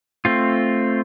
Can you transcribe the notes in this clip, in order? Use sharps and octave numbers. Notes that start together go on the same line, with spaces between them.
A3 C4 F4